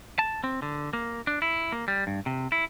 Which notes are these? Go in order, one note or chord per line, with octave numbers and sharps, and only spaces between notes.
A5
C4
D3
A#3
D4
E4
A#3
G3
G2
C3
E4